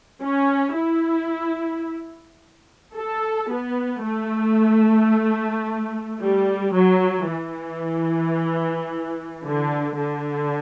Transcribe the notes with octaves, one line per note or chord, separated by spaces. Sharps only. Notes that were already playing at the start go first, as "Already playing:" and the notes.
C#4
E4
A4
B3
A3
G3
F#3
E3
D3
D3